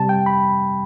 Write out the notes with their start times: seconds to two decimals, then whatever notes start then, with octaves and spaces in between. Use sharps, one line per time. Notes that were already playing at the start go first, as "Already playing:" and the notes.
Already playing: C3 G3 A5
0.09 G5
0.26 B5